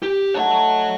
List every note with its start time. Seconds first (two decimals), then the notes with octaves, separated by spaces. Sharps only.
0.03 G4
0.34 A3 D#4 C#5 F#5 A5